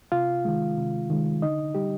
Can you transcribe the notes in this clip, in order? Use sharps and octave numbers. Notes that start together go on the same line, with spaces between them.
C3 F4 F5
D#3 G#3
C3
D#3 G#3
D3 D#4 D#5
G3 G4